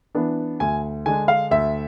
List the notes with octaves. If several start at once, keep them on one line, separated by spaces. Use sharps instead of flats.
E3 B3 D4
D2 G#5
D3 G#3 D4 G#5
F5
D2 E5